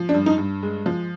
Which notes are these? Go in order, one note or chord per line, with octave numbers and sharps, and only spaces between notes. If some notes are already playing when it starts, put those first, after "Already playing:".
Already playing: F3
D4
G2
D#4
G2
G#3
F3